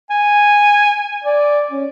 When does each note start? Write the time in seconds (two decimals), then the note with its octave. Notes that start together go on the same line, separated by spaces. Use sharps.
0.10 G#5
1.24 D5
1.71 C#4